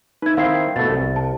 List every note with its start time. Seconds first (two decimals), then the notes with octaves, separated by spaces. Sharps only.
0.22 D#4 B4 E5 G#6
0.37 D#3 C4 E4 F5 C7
0.76 B2 A3 A6
0.90 C2
1.16 A5